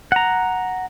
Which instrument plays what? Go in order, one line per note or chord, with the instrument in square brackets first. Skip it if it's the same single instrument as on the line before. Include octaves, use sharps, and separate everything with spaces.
[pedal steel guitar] F#5 A#5